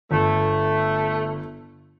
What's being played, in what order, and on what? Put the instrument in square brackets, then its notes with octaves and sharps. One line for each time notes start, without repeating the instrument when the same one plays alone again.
[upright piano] G1 [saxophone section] A3